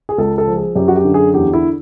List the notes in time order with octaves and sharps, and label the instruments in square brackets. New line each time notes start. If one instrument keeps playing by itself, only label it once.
[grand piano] G#4
C#2 A4
A4
F3
G#4
F#2 G4
F#4
G4
D3
G#4
E2 G4
E4